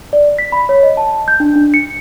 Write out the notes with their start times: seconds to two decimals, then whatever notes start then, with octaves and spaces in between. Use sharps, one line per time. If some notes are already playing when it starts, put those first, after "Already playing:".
0.13 D5
0.39 B6
0.52 B5
0.69 C#5
0.83 D#5
0.97 A5
1.28 G6
1.40 D4
1.56 D4
1.74 C#7